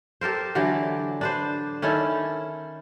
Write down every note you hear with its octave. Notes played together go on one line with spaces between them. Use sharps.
G4 A4 A#4 C5
D3 E3 F#3 G4
D4 B4 C5
D#3 C#4 E4 A4